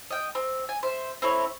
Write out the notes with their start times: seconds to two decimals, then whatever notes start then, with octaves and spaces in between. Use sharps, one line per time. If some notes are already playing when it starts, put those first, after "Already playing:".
0.10 D#5 G5
0.35 C4
0.69 G#5
0.83 C5 E5
1.22 C4 E4 A4 C#5